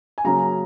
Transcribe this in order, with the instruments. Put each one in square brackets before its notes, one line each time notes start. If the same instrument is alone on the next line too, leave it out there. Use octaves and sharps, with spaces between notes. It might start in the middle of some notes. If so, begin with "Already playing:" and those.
[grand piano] G#5
C#3 F#3 A#3 C#4 A#5